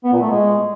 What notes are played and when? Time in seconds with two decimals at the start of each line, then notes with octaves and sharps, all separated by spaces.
0.04 B3
0.13 A#2
0.21 A3
0.30 G#3